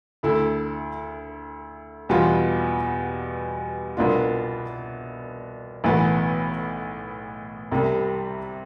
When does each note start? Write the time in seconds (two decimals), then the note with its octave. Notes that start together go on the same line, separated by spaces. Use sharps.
0.23 D2 D3 A3 E4 A4
2.09 E2 B2 G3 B3 F4
3.97 C2 B2 B3 D4 F4
5.84 B1 A2 E3 B3
7.72 C2 C3 G3